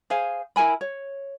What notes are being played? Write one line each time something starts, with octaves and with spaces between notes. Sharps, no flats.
G#4 C5 F5 G#5
E4 A#4 G#5 B5
C#5